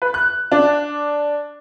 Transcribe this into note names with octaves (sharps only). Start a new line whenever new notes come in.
B4
F#6
D4